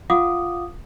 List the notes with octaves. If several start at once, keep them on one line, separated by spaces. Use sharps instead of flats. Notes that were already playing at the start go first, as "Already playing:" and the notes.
F4 F5 F#5 D6 D#6